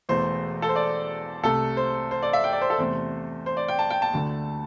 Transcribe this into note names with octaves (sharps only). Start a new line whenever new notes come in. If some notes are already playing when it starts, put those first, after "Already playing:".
E1 E2 E3 A3 C5
A4
C5
D5
C2 C3 A3 A4
C5
C5
D5
E5
G5
D5
C5
A4
E2 C3 A3 C5
C5
D5
G5
A5
G5
A5
D2 D3 A3